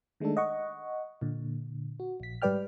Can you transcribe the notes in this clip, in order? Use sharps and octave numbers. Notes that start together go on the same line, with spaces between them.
D#3 G#3 A3 D4 A4
D#5 F#5 C#6
A#2 D3
F#4
A#1 B6
G#2 G3 B4 D5 G5 F6